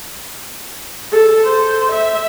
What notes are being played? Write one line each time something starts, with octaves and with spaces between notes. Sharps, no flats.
A4
C5
E5